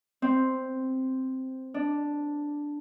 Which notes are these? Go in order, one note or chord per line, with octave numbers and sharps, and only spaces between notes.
C4
D4